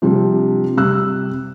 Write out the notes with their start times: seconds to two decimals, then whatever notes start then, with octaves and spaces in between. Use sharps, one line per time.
0.02 C3 F3 G3 C4 D4
0.77 C3 G3 E6 F#6